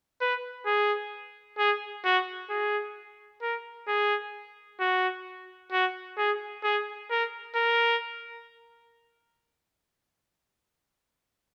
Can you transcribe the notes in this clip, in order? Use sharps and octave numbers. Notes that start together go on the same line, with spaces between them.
B4
G#4
G#4
F#4
G#4
A#4
G#4
F#4
F#4
G#4
G#4
A#4
A#4